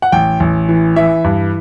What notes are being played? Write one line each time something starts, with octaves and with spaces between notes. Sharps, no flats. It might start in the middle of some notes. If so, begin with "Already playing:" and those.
F#5
A1 G5
A1
E3
E3 E5
G2